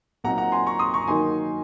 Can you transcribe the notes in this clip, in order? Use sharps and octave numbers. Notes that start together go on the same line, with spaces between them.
A#2 F#3 C4 D#4 F#5 A#5
F#5 A#5
G#5 C6
A#5 C#6
C6 D#6
A#5 C#6
D#3 F#3 A#3 D#4 G#5 C6